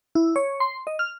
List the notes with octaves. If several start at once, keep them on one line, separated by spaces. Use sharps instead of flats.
E4
C#5
C6
D#5
F6